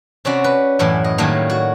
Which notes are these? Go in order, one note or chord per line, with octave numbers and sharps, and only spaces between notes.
C3 C#4 F#4 D5 B5
B4
F#2 A2 E3
D#5
A2 D#3 F#3 G3 A3 A#3
F#4